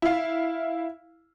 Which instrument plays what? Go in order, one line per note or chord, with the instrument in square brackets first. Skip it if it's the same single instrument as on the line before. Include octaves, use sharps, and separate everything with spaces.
[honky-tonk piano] E4 F5